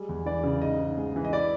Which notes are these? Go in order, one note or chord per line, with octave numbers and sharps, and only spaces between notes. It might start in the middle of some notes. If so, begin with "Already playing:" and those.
Already playing: G3 G#3
E2
E3 D5
C#3
G#2 D#5
G#2
G#3
E3
D#5
E4 D5